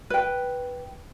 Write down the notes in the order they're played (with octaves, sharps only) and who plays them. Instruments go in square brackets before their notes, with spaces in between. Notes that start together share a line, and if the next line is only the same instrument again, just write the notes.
[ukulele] B4 G5